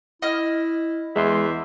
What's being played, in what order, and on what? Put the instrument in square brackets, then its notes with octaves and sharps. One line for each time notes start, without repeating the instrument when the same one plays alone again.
[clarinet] E4 [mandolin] D#5 F6
[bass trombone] E2 [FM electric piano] G#3 C6 [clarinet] E5